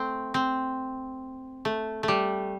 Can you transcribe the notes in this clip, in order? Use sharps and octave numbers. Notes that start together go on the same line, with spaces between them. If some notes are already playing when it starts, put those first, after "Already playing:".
Already playing: A3 C4
C4
A3
A3
G3